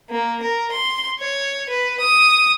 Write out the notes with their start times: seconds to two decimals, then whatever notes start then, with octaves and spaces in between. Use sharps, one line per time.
0.10 A#3
0.43 A#4
0.72 C6
1.19 C#5
1.69 B4
2.00 D#6